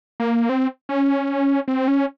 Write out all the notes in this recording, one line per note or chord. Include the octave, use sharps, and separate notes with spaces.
A#3
C4
C#4
C4
C#4